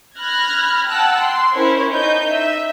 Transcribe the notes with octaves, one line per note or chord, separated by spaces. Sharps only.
B5 F6 F#6 G#6 A#6
F#5 G5 A5 E6 F#6
C6
C#4 E4 A#4 C5 C#5
D#4 G6
E5